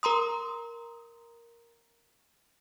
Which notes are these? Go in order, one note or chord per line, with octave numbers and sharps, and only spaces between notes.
A#4 A#5 C6 D#6